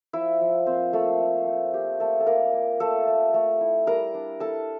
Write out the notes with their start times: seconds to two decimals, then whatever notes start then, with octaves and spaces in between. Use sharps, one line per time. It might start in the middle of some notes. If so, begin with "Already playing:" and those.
0.13 F3 E4 E5
0.41 F3
0.66 A#3 C4 C5
0.93 A3 A#3 A4
1.21 A3
1.47 A3
1.73 A#3 G4
2.00 A3 A#3 A4
2.20 A4
2.27 A#3 F4 A#4
2.53 A#3
2.80 A3 A4 A5
3.07 A3
3.34 A3
3.61 E4
3.87 G3 A#4 A#5
4.14 D4
4.40 E4 A4 A5